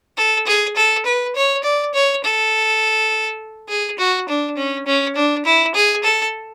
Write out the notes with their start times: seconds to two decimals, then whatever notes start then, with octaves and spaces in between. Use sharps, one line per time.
0.17 A4
0.47 G#4
0.76 A4
1.06 B4
1.36 C#5
1.64 D5
1.94 C#5
2.23 A4
3.69 G#4
3.99 F#4
4.29 D4
4.57 C#4
4.86 C#4
5.16 D4
5.46 E4
5.75 G#4
6.04 A4